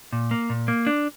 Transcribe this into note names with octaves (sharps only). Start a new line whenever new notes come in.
A#2
A#3
A#2
A#3
D4